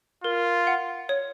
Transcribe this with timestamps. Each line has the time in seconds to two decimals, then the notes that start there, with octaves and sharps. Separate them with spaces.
0.24 F4 A#4
0.67 F#5
1.09 C#5